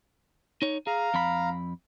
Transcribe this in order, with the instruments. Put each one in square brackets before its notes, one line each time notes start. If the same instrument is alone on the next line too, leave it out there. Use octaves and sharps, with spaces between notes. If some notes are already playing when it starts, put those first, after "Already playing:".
[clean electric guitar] D#4 C#5
[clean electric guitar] G#4 [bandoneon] F5 A#5
[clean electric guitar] F2 B5